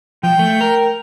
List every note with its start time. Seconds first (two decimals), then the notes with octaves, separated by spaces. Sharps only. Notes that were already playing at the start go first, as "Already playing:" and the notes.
0.23 F3 G5
0.39 A3
0.61 A#4